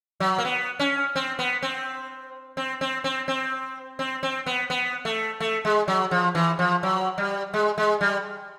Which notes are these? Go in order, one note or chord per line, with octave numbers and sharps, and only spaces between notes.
F#3
A#3
B3
C#4
C4
B3
C4
C4
C4
C4
C4
C4
C4
B3
B3
A3
A3
G#3
F#3
F3
E3
F3
F#3
G3
G#3
G#3
G3